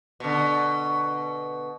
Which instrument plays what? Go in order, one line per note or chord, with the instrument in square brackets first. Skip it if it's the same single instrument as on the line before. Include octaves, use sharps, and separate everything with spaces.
[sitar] B2 D3